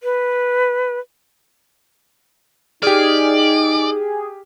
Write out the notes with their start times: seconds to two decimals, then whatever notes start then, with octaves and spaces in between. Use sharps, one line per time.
0.03 B4
2.83 D#4 G4 G#4 D5 F6